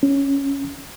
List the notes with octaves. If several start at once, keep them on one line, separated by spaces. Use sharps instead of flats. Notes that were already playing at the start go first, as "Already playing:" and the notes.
C#4